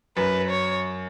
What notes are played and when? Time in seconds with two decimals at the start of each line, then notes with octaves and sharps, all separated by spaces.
0.17 F#2 B4
0.50 C#5